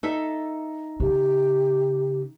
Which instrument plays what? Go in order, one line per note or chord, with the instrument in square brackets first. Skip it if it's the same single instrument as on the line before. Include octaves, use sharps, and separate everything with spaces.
[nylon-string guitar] D#4 A4 E5
[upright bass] C#3 [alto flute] G4